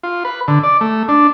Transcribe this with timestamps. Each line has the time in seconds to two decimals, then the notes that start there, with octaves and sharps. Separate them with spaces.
0.03 F4
0.25 B4
0.48 D3
0.63 D5
0.81 A3
1.08 D4